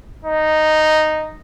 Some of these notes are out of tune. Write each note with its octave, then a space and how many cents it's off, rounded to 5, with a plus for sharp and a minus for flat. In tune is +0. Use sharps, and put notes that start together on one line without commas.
D#4 -5